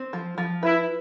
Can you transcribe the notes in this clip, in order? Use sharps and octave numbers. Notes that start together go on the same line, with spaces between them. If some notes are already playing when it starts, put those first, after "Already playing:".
Already playing: C4
F3
F3
E4 B4